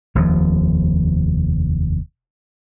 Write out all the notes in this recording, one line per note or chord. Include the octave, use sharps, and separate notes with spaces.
F1 D#2 C3 F3